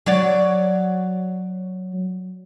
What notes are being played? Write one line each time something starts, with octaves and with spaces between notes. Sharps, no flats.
F#3 C#5 D5